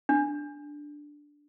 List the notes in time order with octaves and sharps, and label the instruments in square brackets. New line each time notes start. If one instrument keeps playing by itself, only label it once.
[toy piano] D4